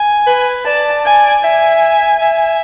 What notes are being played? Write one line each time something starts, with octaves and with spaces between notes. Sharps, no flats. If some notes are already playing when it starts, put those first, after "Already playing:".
Already playing: G#5
B4
D5 A5
G#5
E5 G#5
E5